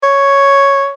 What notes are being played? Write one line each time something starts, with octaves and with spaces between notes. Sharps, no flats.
C#5